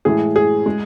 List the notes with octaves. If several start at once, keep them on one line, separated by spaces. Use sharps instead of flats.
A2 E3 G#3 G#4
G#4
G#3